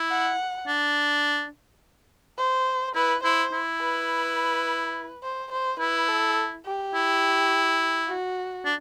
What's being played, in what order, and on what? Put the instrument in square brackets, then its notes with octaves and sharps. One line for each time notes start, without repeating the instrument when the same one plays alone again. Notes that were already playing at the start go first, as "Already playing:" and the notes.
Already playing: [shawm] E4
[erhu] F#5
[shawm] D4
[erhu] C5
[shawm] E4 [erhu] B4
[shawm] E4 [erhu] C5
[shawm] E4
[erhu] B4
C5
C5
[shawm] E4 [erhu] B4
[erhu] A4
G4
[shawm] E4
[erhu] F#4
[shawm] D4